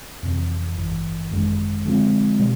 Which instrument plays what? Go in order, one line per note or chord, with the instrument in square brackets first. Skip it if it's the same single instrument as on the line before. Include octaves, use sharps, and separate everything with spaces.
[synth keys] F2 C3 E3
G#1 G2 E3
G#1 F#2 D#3 G#3
D3 F3 G#3 C4 F4
B2 G3